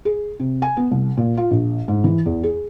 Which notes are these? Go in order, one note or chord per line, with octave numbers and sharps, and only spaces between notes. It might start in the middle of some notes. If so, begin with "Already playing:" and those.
G#4
C3
G#5
B3
C2
A#2
F4
A#1
G#2
E3
E2
G#4